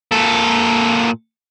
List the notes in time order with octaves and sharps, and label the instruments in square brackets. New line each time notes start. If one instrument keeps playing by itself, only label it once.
[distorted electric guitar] A#2 A4